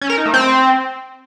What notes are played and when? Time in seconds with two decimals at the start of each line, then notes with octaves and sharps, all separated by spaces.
0.02 C#4
0.10 A#4
0.18 D#4
0.26 A3
0.34 C4